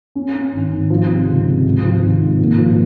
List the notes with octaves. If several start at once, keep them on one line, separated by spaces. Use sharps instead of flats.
C#4
C#4
G#1
G#1
F3
C3
C#2
C3
G#2
F3
G#1
G#2
A#2
F3